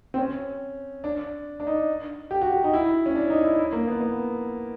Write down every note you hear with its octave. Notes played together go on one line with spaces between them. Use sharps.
C4
C#4
D4
D4
D#4
G4
F#4
G4
D#4
E4
C#4
D4
D#4
E4
E4
A#3
B3
B3